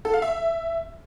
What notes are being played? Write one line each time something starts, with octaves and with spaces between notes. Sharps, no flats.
A4
F5
E5